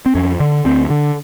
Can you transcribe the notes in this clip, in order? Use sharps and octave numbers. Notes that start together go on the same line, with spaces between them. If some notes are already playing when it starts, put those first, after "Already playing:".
C4
F2 C#4
D3
D2 C4
D3